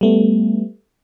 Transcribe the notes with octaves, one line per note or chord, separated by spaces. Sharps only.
G3 A3 B3